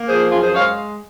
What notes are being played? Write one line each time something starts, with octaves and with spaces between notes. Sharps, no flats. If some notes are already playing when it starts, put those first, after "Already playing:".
Already playing: A#3
F3 G#4 C5
F#2 F4 G#4
G#4 C5
G#3 C#5 F5